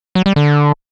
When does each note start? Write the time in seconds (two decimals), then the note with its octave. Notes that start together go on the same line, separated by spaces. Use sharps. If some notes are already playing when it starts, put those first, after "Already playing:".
0.15 F#3
0.26 G3
0.36 D3